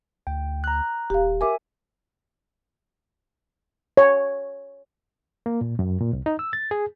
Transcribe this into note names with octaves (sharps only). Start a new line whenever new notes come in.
D2 G5
A#5 F#6
D#1 G4 F5
G4 A#4 E5 G#5 D6
C#5
A#3
A#2
F#2
A#2
C2
D#4
E6
A6
G#4